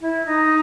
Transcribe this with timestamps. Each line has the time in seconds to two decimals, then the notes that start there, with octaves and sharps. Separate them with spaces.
0.01 E4
0.25 D#4